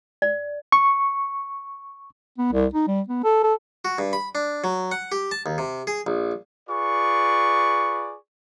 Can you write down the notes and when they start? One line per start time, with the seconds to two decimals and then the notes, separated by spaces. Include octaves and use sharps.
0.22 D5
0.72 C#6
2.38 B3
2.52 C2
2.74 D#4
2.88 G3
3.08 B3
3.24 A4
3.44 A4
3.85 F#4
3.98 G2
4.13 B5
4.35 D4
4.64 F#3
4.92 F#5
5.12 G4
5.31 A5
5.46 D#2
5.58 C3
5.87 G#4
6.07 A#1
6.68 F4 G#4 B4 D5 C#6